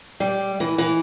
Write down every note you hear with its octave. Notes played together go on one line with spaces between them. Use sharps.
G3
E3
E3